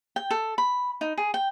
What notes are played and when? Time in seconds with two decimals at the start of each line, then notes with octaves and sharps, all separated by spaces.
0.16 G5
0.31 A4
0.58 B5
1.01 D#4
1.18 G#4
1.34 G5